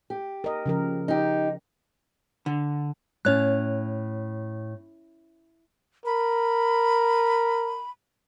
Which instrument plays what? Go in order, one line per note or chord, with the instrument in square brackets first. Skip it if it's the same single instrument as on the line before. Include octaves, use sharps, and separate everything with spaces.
[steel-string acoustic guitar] G4
[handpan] A#4 D#5
C#3 F3 A#4
[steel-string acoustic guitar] D#4 G4
[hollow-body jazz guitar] D3
[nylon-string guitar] A2 [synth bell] C#4 C#5 F#6
[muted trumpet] A#4 [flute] B5